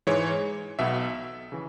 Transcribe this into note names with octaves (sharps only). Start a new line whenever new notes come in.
G#2 E3 G#3 C#5
B1 B2 B3 E5
C#3 E3